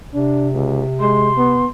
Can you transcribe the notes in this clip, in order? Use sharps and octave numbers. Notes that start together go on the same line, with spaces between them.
C3 D4
C#2
G#3 C6
B3